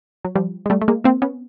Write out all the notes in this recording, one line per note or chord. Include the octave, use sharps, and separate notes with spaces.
F#3
F3 G3
G#3
G3 A3
A3
G#3 A#3
A#3 C4
B3 C#4